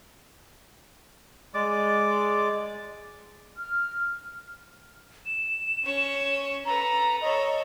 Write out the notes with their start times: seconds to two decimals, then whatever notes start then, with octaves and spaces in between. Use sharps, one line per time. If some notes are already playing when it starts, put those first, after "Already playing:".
1.54 G#3 D5 D6
3.56 F6
5.26 E7
5.83 C#4 C#5
6.65 A4 B4 A#5
7.22 A4 C#5 D#5